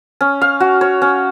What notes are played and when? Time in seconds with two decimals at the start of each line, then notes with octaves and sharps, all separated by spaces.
0.21 C#4
0.41 F5
0.60 F#4
0.81 C#5
1.02 C#4